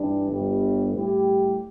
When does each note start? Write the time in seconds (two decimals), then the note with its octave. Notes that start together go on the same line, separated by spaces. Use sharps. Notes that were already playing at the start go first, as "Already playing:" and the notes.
Already playing: G2 E3 G3 D4
0.27 G1 G2 G3
0.92 A2 G3 E4 G4